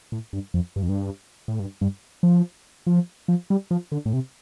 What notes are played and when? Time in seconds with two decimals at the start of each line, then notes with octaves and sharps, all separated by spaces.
0.12 A2
0.33 G2
0.54 F2
0.76 G2
0.83 F2
0.89 G2
1.48 A2
1.60 G2
1.81 G2
2.23 F3
2.87 F3
3.28 F3
3.50 G3
3.71 F3
3.92 D3
4.06 A2
4.13 C3